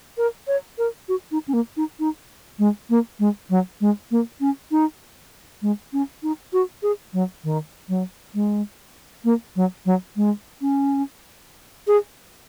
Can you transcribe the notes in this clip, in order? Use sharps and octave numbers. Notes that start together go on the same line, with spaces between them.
A#4
C#5
A#4
F#4
D#4
C#4
A#3
D#4
D#4
G#3
A#3
G#3
F#3
G#3
A#3
C#4
D#4
G#3
C#4
D#4
F#4
G#4
F#3
D#3
F#3
G#3
A#3
F#3
F#3
G#3
C#4
G#4